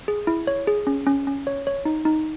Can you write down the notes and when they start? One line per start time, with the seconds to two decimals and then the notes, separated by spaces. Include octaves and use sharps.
0.08 G#4
0.27 E4
0.47 C#5
0.67 G#4
0.87 C#4
1.07 C#4
1.27 C#4
1.47 C#5
1.67 C#5
1.85 D#4
2.05 D#4